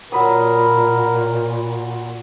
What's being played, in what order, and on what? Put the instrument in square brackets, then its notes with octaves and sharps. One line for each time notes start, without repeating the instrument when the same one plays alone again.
[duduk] A#2 [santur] F#3 B5 D#6 [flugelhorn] A#4